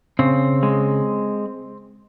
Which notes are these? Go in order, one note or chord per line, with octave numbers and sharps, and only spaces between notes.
C#3 C4
G#3